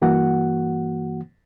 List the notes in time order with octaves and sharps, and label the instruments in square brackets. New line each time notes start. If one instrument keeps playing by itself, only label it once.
[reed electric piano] G2 E3 A#3 F#4 F#5